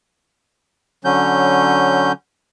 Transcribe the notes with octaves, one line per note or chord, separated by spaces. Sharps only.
D3 F#3 C#4 G6